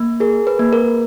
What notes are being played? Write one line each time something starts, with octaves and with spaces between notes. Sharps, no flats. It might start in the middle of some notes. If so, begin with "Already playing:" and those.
Already playing: A#3
G#4 A#4
B4
A#3
A#4